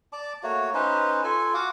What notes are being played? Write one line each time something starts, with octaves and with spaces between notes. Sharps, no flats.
D5 A5 D6
A3 A#3 F#4 C#5
C#4 D#4 B4 C5
F4 A4 G#5
F#4 F5 F#5 D6